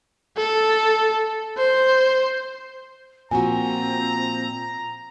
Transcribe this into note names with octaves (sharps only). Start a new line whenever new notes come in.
A4
C5
A#2 F3 C4 F#4 G#5 A#5